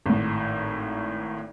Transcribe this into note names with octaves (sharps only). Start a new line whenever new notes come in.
G#1 A2